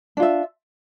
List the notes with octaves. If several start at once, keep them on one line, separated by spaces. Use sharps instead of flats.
D4 F4 E5